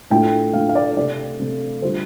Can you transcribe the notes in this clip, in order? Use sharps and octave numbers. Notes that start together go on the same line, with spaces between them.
A2 A3 D4 F4 G5
A2 A3 D4 F4 F5
F5
D5
C3 A3 C4 D5
C3 A3 C4
D3 G3 F4 C5